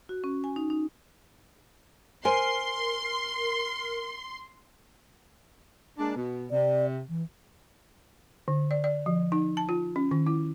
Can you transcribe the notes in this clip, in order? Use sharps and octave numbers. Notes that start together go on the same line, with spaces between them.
F#4
C#4
G#5
D#4
D#4
A#4 C5 G#5 C6
G#3 A#3 D4
B2
C3 D5
E3
D3
D5
D5
F3
D#4
A5
F4
C#4
D#3
E4